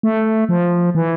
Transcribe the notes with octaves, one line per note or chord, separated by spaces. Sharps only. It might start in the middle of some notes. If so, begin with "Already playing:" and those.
A3
F3
E3